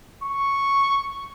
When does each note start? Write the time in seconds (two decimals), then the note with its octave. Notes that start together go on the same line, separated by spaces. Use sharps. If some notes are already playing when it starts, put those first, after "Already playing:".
0.23 C#6